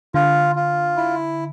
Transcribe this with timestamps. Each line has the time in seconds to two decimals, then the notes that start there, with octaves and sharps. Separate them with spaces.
0.14 D3 F4
0.55 F4
0.97 E4